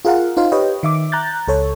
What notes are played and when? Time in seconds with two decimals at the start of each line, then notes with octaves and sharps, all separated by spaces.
0.05 F4 G#4 A#4 F5 F#5
0.37 D#4 F4 C5 F5
0.52 G4 B4 C#5 D#5 G5
0.83 D#3 E5 D6
1.12 A#5 F#6 G6 A6
1.48 C#2 A4 C#5